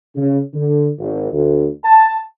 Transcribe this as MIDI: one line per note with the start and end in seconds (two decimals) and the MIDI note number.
0.16 0.40 49
0.54 0.89 50
0.99 1.31 32
1.32 1.68 38
1.84 2.16 81